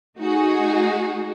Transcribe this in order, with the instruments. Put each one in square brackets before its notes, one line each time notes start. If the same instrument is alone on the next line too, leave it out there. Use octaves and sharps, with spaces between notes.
[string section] A3 D#4 F#4 G#4